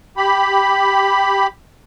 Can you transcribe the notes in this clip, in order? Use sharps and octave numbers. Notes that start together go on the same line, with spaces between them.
G4 B5